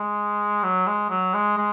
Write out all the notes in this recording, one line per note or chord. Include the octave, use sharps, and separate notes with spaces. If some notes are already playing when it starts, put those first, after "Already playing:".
Already playing: G#3
F#3
G#3
F#3
G#3
G#3